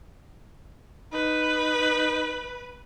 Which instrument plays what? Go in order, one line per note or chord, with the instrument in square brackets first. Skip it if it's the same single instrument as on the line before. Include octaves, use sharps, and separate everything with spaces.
[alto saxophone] D#4 [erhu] B4